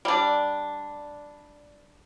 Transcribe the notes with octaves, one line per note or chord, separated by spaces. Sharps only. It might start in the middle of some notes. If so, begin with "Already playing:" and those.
G3 D4